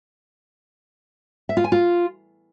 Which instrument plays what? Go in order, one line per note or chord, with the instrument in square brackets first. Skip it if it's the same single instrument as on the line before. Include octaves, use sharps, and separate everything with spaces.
[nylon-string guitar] E5
F4
G#5
F4